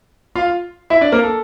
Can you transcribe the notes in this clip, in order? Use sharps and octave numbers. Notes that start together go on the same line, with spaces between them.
F4 F5
E4 E5
D4 D5
A#3 A#4
A4